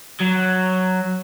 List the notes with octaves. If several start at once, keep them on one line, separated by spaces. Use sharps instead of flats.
F#3